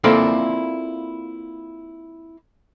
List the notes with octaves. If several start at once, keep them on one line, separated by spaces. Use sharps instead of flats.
A#3 C4 E4 F4 A4 D5